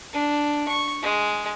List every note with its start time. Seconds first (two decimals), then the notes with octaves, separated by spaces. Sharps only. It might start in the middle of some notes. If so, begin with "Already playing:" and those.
0.13 D4
0.68 C#6
1.02 G#3